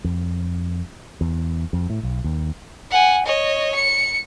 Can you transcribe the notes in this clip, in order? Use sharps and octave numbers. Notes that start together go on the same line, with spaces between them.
F2
E2
F2
A2
B1
D#2
F#5 G#5
C#5 D#5
C#7